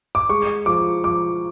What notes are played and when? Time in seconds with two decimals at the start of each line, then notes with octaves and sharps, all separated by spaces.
0.15 D6
0.29 G#3 C#6
0.66 F3 D6
1.04 F3 D6